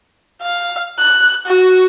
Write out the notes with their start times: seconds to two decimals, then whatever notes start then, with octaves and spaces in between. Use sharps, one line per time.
0.42 F5
0.99 F#6
1.46 F#4